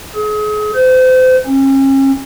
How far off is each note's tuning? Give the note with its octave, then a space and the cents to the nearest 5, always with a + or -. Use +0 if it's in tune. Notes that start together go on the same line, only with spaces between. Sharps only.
G#4 +35
C5 -35
C#4 -40